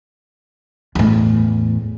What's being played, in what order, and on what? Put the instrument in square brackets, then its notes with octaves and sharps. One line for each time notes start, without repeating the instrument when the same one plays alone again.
[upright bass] E2 A2